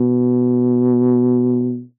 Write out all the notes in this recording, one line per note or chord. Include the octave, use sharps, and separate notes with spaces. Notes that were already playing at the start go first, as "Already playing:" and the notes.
Already playing: B2